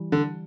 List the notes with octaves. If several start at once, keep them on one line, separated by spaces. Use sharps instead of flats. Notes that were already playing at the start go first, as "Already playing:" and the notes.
Already playing: E3 G3
D3